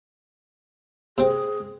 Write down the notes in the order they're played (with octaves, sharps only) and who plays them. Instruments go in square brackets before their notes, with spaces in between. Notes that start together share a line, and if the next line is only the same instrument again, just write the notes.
[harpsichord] C3 C4 [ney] G#4